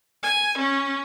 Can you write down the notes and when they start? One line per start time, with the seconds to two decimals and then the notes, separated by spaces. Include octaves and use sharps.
0.23 G#5
0.58 C#4